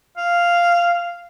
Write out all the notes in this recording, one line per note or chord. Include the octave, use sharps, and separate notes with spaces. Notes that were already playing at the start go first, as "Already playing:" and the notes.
F5